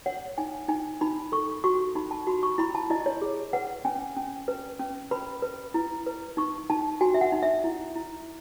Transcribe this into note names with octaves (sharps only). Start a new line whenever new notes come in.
C#5 F#5
D#4 G#5
D#4 G#5
D#4 B5
A4 C#6
F#4 C#6
D#4 B5
A5
F#4 B5
C#6
E4 B5
A5
E4 D#5
C#5
G#4
B4 F#5
C#4 G#5
C#4
B4
C#4
B4 B5
B4
E4
B4
D#4 C#6
D#4 A5
F#4 G#5
E5
F#5
D#4
E5
E4
E4